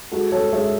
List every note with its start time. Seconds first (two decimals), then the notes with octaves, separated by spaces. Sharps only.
0.12 G#3 F#4 A4
0.32 G#3 A4 C#5
0.53 G#3 C#5 E5